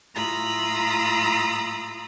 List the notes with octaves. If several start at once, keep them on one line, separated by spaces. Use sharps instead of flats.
A2 F4 A#5 B5 D#6 E6